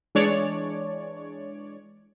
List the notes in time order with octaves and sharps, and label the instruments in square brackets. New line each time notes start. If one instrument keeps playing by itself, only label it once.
[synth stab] E3 G#3 D4 C#5 D5